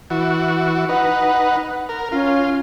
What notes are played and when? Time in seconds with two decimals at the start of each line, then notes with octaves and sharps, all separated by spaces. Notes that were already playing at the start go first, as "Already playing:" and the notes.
0.10 E3 F#4
0.89 D#4 B4 F#5
1.89 A#4
2.12 C#4 F4